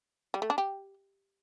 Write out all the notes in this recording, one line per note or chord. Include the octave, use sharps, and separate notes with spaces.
G3
A3
D4
G4